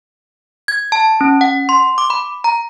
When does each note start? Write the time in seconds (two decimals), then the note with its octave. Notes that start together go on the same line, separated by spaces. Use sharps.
0.68 G#6
0.92 A5
1.21 C#4
1.41 F#5
1.69 C6
1.98 D6
2.10 B5
2.44 A#5